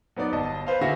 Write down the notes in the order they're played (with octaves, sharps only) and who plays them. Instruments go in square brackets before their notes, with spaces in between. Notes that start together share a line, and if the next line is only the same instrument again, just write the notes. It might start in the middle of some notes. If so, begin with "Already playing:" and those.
[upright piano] F#3 B3 D#4 D5
G1 D#5 A5
B4 C5 F5
D3 F#4 G#4 E5 F5 A#6